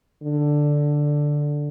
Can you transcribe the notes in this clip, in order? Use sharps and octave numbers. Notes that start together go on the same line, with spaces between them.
D3